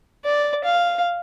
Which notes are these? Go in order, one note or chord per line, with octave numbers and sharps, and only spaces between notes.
D5
F5